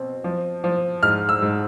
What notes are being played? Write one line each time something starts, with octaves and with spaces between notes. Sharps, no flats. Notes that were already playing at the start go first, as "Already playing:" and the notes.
Already playing: B2 C4
F3
F3
G#2 F6
E6
G#2